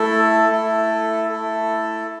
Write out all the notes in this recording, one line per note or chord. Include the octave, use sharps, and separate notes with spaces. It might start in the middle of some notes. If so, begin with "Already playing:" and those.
Already playing: A3 E4 A4
A3 E4 A4
A3 E4 A4